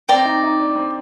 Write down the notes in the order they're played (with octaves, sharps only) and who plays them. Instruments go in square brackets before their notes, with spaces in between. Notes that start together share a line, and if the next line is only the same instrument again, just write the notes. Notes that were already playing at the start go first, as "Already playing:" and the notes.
[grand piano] C4 [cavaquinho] D5 G5 A#5
[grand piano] D#4
D#4
D4
C4